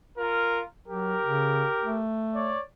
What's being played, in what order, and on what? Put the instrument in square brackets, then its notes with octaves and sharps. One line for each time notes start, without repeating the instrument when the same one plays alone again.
[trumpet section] F4 A#4
[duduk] F#3 [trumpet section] G4 A#4
[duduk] C#3
A3
[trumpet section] C#5 D5